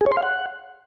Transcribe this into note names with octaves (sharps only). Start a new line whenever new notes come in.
G#4
C#5
C6
F5
F#5